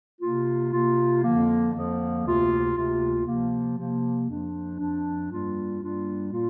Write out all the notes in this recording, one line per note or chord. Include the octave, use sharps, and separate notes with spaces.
C3 A#3 F4
C3 A#3 F4
F2 D3 F3 A#3
F2 D3 F3 A#3
D2 C3 A#3 F4
D2 C3 A#3 F4
C3 F3 A#3
C3 F3 A#3
F2 F3 D4
F2 F3 D4
G2 G3 A#3 D4 F4
G2 G3 A#3 D4 F4
A#2 A#3 F4